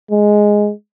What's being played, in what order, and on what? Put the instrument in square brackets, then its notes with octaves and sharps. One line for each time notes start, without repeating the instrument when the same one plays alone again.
[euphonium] G#3